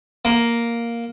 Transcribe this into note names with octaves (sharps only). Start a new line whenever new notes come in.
A#3